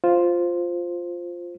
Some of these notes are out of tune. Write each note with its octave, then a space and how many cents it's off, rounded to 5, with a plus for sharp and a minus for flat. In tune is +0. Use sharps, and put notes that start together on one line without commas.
F4 +0 C5 +0